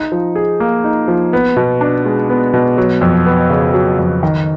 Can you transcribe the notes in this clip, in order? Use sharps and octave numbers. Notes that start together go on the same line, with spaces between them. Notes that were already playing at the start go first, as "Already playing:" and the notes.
Already playing: D#4
F3
G#4
A#3
D#4
F3
B3
B2
D4
G#3
B3
B2
F#3
F2
B3
C#3
F#3
F2
D#3